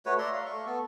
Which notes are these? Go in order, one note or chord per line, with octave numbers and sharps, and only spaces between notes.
A3 F#4 B4 C#5
D5 E5 A#5 C6
F5
A3 C#6
B3 A4